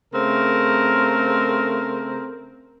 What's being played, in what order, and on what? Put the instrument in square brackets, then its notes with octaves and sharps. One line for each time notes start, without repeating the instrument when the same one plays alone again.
[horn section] C#3 A3 C4 A#4